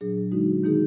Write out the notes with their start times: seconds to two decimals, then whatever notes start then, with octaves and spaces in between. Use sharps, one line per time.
0.01 A#2 F#3 D4 G#4
0.32 D3 G#3 D#4 F#4
0.64 D#3 A#3 D#4 G#4